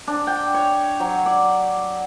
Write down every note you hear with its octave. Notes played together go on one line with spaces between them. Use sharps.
D4
G5
C#5
F#3
D5